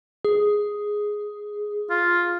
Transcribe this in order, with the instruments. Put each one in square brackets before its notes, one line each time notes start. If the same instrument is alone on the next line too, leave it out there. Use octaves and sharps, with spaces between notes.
[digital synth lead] G#4
[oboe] F4